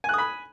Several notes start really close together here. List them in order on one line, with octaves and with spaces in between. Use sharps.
G#5 F#6 D#6 B5